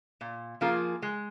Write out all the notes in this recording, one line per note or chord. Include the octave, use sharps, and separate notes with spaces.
A#2
F3 A#3 F4 G#4
G#3